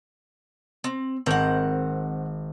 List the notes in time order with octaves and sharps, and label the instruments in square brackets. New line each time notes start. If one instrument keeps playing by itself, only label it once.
[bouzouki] C4
[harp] G#1 A#4 G6 [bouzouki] C4 F#5